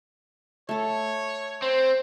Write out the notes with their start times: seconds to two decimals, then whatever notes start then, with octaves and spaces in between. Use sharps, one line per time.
0.69 A3 A4 C#5
1.62 C4 C5